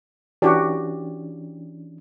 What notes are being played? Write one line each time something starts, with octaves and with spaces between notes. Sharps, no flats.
E3 C#4 D4 F#4 G4